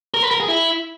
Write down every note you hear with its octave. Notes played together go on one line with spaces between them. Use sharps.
A#4
B4
A#4
G#4
E4